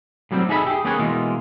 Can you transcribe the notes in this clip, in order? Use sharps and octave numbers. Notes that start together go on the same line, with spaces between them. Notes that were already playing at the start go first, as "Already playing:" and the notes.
A2 F#3 G3 C4
D#4 G#4 A4 E5 F5 B5
G4 G#4
A#3 C#4 G#4 B4 C#5
B2 E3 G#3 A#3 F4